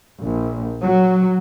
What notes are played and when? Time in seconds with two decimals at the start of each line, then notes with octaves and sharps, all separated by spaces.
0.21 A#1
0.82 F#3